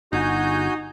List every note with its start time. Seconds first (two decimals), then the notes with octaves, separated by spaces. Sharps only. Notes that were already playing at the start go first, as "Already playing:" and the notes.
0.13 G1 D#4 F#4 G#5 G6